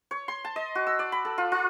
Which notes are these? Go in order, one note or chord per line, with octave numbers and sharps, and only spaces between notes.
C#5
C6
A5
D#5
F#4
E6
D5
B5
A4
F4
F4